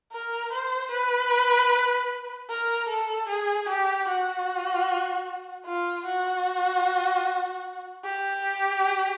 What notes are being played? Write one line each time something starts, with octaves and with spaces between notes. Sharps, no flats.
A#4
C5
B4
A#4
A4
G#4
G4
F#4
F4
F#4
G4